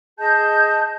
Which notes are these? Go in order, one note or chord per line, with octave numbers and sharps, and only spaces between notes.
G#4 D#5 A5 G6